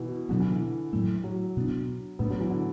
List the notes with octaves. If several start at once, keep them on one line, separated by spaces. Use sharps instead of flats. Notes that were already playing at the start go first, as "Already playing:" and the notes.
Already playing: B2 E3
B2 D3 F#3 B3
E3
E3
A2 F#3 A3
F#3
B2 B3 D4
A2 A3 B3 D4
F#3
E3
D3